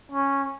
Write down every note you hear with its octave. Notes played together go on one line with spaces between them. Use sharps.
C#4